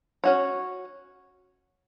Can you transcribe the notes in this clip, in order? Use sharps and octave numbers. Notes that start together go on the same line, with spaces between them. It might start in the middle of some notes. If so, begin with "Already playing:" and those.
C#4 F#4 C#5